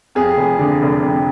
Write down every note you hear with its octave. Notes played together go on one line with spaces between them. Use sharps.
F2 G#4
F1
D3
F1
F2